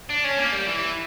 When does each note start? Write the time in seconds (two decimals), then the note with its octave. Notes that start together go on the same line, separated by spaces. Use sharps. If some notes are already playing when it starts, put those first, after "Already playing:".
0.10 D4
0.25 C#4
0.39 A#3
0.53 G3
0.66 E3